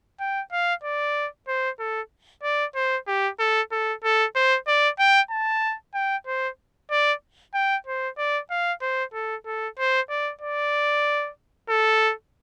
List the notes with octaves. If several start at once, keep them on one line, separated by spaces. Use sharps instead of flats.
G5
F5
D5
C5
A4
D5
C5
G4
A4
A4
A4
C5
D5
G5
A5
G5
C5
D5
G5
C5
D5
F5
C5
A4
A4
C5
D5
D5
A4